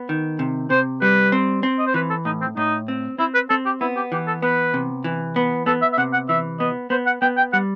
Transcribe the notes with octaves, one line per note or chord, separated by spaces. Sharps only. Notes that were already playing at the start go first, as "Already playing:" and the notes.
Already playing: B3
D#3
C3
C3 C5
G3 B4
C4
C4
D#5
C5
E3 B4
A4
A2 D#4
C4
A2 D#4
C4
C4 E4
B4
C4 A4
G4
B3 E4
G4
E3 G4
A4
B3 B4
C3
E3
B3
B3 A4
E5
E5
C3 F#5
F#5
E3 E5
B3 D#5
B3 C5
F#5
B3 G5
G5
G3 F#5